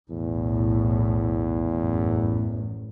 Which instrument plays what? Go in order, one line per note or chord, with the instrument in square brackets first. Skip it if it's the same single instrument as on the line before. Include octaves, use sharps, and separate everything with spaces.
[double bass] B1 A2 [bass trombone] E2
[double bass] A1 F#2